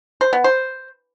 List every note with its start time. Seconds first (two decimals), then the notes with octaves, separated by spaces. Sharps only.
0.21 C5
0.33 B3
0.44 C5